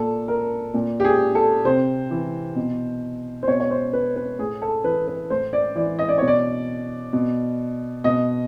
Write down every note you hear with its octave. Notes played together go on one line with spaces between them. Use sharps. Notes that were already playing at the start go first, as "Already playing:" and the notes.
Already playing: A#2 A4
A#4
A#2
G4
G#4
A4
C3 C5
E3
B2
C5
B2 C#5
C#5
C5
B4
B4
A2 G#4
A4
E3 B4
B4
A2 C5
D5
E3 D5
D#5
D5
B2 C#5
D5
B2
B2 D#5